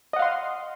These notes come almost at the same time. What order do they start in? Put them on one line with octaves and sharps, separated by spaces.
D#5 F#5 F5 C6